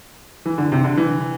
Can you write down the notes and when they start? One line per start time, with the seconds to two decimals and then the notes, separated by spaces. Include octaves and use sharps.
0.46 E3
0.58 D3
0.72 C3
0.84 D3
0.97 E3